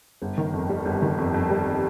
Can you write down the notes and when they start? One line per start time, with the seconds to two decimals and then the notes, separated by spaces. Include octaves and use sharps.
0.22 G1
0.38 D#3
0.54 F2
0.69 G3
0.85 G1
1.02 D#3
1.18 F2
1.34 F2
1.50 G3